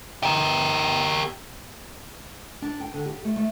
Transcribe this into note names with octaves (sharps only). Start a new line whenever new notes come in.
G4 A#4
D4
G5
D3
G4
A3
A3